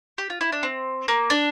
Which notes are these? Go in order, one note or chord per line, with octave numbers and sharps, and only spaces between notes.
G4
F4
E4
D4
C4
A#3
D4